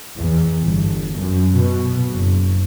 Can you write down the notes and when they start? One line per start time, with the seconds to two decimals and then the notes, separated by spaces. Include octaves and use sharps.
0.19 E2
0.63 G1
1.15 F#2
1.55 B2
2.09 F#1